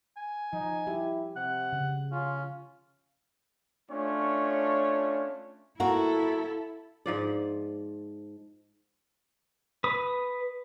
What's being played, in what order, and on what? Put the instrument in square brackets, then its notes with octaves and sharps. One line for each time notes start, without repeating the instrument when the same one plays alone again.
[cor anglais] G#5
[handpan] F3 [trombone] D#4
[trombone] E4 [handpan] G4
[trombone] C3 [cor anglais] F#5
[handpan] C#3
[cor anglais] C#4 [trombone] F4
[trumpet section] A3 C#4 D4 F4 C#5
[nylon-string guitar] A#3 F#4 [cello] E4 A4
[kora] G#2 F3 D5
[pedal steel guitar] B4 D#6